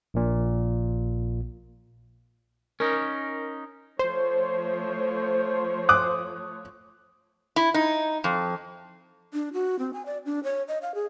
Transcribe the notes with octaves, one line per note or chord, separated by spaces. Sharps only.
A#1 A#2
C#4 D#4 A#4
F3 A3 C5 C#5
D6 D#6 F#6
E4
D#4
F2
D4
F#4
C4
G#5
D5
D4
C#5
D#5
F5
G#4